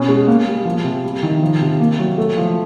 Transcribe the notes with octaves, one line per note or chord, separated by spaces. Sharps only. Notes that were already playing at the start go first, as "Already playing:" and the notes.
Already playing: B2 C#4
G#3
A#3
G3
F3
C3
G3
D#3
F3
C3
A#3
F#3
A3
F3